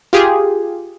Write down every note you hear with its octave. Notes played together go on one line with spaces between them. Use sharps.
F4 G4 G#4